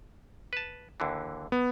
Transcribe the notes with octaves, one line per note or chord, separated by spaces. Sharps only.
B4 A5
D#2 D3 E3
B3